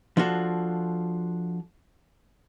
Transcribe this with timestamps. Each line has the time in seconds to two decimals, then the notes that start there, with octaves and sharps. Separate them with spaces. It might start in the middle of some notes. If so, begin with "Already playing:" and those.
0.17 F3 D4 F4 F#4 A4